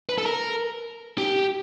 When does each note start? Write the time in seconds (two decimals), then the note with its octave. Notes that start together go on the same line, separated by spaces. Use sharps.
0.09 B4
0.18 A4
0.26 A#4
1.18 G4